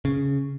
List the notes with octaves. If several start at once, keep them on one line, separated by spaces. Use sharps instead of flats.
C#3